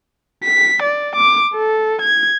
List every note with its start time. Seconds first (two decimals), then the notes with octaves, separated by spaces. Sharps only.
0.44 B6
0.83 D5
1.16 D6
1.54 A4
2.02 G#6